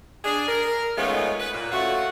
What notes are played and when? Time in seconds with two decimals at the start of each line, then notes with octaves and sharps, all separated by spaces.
0.25 D4 G#4
0.49 A#4
0.98 G#3 A3 B3 C#4 D#4 F4
1.40 B4
1.54 A#2
1.72 A3 C#4 F4 F#4